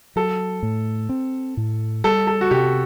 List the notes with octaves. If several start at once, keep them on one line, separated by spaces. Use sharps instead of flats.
F#3 A4
A2
C4
A2
G3 A4
A4
F#4
C3 G4